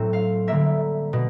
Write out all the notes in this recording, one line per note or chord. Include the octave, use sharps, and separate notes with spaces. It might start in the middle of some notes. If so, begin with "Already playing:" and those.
Already playing: A2 F#3 A3 C4
F5
D3 G3 A#3 E5
B2